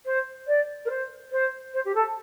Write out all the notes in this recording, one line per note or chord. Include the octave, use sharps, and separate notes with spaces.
C5
D5
A#4
C5
C5
C5
G4
A4